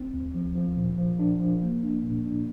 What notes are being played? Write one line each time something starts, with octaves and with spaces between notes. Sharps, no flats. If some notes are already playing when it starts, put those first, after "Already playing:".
Already playing: C4
D2
F3
F3
A#2
F3
D4
F3
A#3
D4
A#2
D4